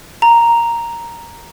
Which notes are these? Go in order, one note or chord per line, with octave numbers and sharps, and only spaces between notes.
A#5